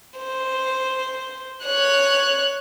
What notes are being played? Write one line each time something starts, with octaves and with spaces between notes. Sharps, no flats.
C5
C#5 F#6